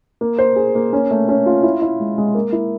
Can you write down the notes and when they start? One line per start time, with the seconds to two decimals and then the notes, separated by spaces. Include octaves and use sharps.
0.21 A#3
0.39 C5
0.56 G#4
0.75 A#3
0.93 C#4
1.11 A3
1.29 C#4
1.46 F4
1.63 E4
1.82 E4
2.00 G#3
2.18 G#3
2.35 A#3
2.52 E4